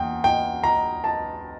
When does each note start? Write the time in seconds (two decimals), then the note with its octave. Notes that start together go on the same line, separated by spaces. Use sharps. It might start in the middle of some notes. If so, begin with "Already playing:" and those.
Already playing: E2 A#3 G5
0.24 G5
0.64 A#5
1.04 A5